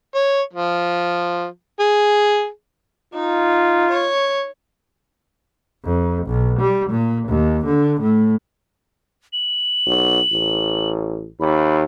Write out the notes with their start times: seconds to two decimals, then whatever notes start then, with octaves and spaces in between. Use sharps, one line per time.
0.15 C#5
0.53 F3
1.80 G#4
3.14 D#4 F4
3.90 C#5
5.85 F2
6.27 B1
6.60 G3
6.90 A#2
7.29 D#2
7.66 D3
8.01 A2
9.33 F#7
9.86 B1
10.33 A1
11.40 D#2 B5